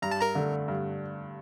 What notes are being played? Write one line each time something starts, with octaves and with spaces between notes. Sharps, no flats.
G2 A#5
A5
A#4 A#5
D3 A3
G2